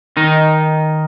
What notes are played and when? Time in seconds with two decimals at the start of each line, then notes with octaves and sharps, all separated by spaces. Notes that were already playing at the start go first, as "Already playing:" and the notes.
0.17 D#3 D#4